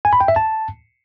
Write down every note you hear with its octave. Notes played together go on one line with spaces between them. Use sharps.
G#5
B5
G5
E5
A5